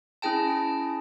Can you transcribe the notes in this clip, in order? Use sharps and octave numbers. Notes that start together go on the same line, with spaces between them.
C#4 E4 G#4 G5 A5